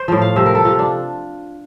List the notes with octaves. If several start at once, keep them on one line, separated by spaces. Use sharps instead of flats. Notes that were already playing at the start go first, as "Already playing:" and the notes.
Already playing: C5
A2 F3
F5
C3 F3 E5
A#4
A4
C3 F3 F4
D4